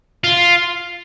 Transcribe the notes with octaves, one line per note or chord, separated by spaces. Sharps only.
F4